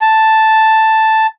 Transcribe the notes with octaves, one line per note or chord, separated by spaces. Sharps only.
A5